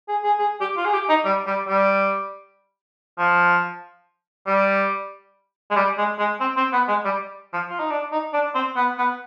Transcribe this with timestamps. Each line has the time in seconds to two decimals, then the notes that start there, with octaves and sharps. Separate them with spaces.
0.08 G#4
0.24 G#4
0.39 G#4
0.61 G4
0.77 F4
0.85 G#4
0.93 G4
1.09 D#4
1.25 G3
1.47 G3
1.68 G3
3.18 F3
4.47 G3
5.71 G#3
5.76 G3
5.98 G#3
6.19 G#3
6.40 C4
6.57 C4
6.73 B3
6.88 G#3
7.05 G3
7.53 F3
7.69 F4
7.79 D#4
7.90 D4
8.12 D#4
8.33 D4
8.54 C4
8.76 B3
8.98 B3